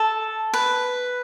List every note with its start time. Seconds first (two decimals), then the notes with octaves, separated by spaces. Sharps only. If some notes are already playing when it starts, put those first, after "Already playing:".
Already playing: A4
0.54 B4